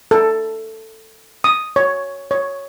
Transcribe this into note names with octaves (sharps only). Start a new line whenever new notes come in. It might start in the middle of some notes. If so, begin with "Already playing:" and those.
A4
D#6
C#5
C#5